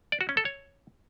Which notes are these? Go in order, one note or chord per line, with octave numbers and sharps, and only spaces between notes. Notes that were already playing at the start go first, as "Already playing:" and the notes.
D5
F#4
C#4
A4
C#5